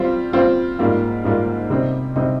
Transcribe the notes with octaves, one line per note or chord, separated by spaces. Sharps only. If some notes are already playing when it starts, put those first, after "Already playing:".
Already playing: G3 C4 F4 C5
G3 C4 F4 C5
G#2 G3 A#3 F4
G#2 G3 A#3 F4
C3 G3 C4 D#4
C3 G3 C4 D#4